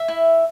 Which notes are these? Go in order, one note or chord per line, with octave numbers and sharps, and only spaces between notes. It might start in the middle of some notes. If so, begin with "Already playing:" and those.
Already playing: E5
E4